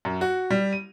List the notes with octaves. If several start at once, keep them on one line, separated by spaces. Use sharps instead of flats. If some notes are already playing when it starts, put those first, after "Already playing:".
F#2
F#4
G3
D#7